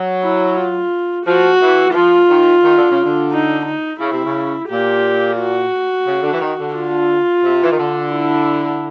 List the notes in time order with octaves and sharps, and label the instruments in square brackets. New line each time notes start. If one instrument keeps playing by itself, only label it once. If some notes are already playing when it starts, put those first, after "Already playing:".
Already playing: [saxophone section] F#3
[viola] E4
F4
[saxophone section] F3 [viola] F#4
[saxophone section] E3
E3
[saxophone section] F3 [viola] F4
[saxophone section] D#3
D#3
D3
C#3
D3
[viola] D#4
D#4
[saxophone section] C#3 [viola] E4
[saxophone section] C3
C#3
[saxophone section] A#2 [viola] G4
[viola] F#4
[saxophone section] C#3
D3
E3
D#3
D3
[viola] F4
[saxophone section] C3
E3
D#3
D3
[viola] E4